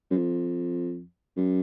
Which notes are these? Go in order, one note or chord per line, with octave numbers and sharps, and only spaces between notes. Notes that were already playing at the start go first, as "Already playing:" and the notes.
F#2
F2
F#2